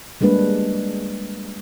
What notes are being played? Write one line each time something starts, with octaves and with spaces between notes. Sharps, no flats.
G3 G#3 A#3 D4 B4